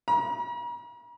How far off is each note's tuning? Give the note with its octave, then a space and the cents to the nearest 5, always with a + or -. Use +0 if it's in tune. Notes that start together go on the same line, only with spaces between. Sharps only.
A#5 +45